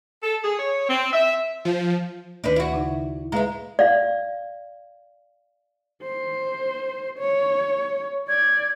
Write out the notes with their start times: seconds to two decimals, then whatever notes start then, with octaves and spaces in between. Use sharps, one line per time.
0.23 A4
0.43 G#4
0.58 C#5
0.89 C4
1.13 E5
1.65 F3
2.44 D2 D#3 D4 D#4 B4
2.56 E4 F#4
2.74 C#3 D#4
3.32 G#3 E4 B4 F5 A#5
3.79 D5 F5
6.03 C5
7.19 C#5
8.29 D5 G#6